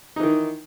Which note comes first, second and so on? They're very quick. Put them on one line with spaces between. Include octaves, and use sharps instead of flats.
D#4 E3 D#3